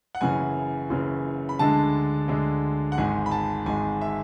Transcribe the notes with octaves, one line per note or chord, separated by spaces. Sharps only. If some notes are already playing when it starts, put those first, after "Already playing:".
F#5
F#1 F#2 C#3 E3 G#5
F#1 F#2 C#3 E3
B5
D2 D3 G#3 D4 A5
D2 D3 G#3 D4
F#5
G#1 G#2 G#3 G#5
B5
A5
G#1 G#2 G#3 G#5
E5